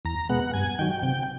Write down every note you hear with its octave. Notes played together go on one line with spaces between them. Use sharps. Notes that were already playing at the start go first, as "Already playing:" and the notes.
E2 A#5
B2 G#3 B3 F#5
G2 G#5
D#3 F#3 G5
C3 G5